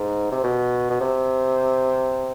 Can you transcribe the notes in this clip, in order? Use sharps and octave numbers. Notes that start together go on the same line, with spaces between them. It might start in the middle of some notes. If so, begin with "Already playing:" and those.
Already playing: G#2
C3
B2
B2
C3